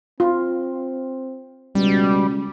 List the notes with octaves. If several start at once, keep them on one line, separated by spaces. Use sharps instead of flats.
C4 F4
C#2 B2 G3